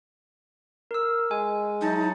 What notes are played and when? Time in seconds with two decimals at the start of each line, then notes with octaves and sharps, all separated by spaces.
0.91 A#4 E6
1.31 G#3 G#5
1.81 F#3 D#4 E4 A5